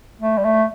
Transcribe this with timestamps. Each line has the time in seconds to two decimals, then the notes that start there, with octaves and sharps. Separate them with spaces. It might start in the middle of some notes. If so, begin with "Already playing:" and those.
0.21 A3
0.38 G3
0.44 A3